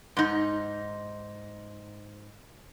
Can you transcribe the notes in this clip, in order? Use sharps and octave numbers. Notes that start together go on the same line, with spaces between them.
G#2 D#4